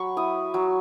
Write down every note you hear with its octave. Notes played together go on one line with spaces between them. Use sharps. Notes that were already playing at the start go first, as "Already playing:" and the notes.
Already playing: F#3 F#5 B5 C#6
E4 D#6
F#3